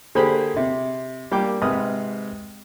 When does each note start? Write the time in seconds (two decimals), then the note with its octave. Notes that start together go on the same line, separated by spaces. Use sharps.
0.15 D3 A#3 G4 G#4 C5 B5
0.56 C3
1.31 G3 A#3 D4 G5 D6
1.62 G#2 C3 B4 D#6 F6